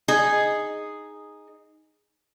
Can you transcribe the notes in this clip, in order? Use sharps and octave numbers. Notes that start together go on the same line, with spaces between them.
D#4 G#4